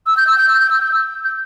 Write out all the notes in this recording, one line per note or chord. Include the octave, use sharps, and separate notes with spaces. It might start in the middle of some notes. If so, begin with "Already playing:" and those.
E6
G6
E6
G6
E6
G6
E6
G6
E6
G6